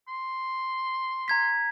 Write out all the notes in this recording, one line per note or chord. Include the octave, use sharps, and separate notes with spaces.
C6
A#5 G#6 B6